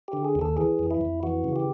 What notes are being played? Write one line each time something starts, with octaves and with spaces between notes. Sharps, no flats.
G4
D3
G#4
D#2
A4
E3 G#4
F2
E4
F2
E3 F#4
C#3
G4